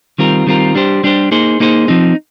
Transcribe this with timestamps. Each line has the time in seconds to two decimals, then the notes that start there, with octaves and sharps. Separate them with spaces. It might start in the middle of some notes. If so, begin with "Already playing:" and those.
0.18 D#3 G3 C4 F4 A#4
0.47 D#3 G3 C4 F4 A#4
0.75 G3 D4 G4 C5
1.03 G3 D4 G4 C5
1.31 A#3 D#4 G#4 C5
1.60 A#3 D#4 G#4 C5
1.88 F3 C4 D#4